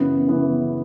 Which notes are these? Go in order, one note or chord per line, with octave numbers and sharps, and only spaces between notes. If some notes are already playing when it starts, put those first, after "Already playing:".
Already playing: F#2 C#3 E3 B3
F#2 C#3 E3 B3